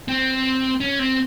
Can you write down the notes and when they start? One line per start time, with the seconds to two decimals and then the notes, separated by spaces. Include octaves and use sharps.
0.08 C4
0.80 C#4
0.99 C4